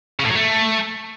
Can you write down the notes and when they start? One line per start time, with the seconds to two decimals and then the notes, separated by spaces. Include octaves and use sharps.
0.19 C#3
0.25 A2
0.30 F#3
0.35 A3